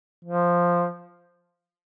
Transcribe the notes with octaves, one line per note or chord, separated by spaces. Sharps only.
F3